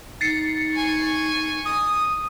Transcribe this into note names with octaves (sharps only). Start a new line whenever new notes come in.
D#4 A6 C7 C#7
G#5 C#6
D#6